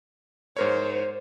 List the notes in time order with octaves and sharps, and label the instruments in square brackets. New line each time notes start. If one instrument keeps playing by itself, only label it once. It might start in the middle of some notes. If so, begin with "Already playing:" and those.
[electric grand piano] G#2 A#4 C#5 [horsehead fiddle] C5